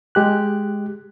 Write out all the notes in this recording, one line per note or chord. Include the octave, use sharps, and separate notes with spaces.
G#3 G4 F#6